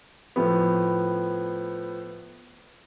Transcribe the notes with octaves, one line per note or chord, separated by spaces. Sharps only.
A2 F3 B3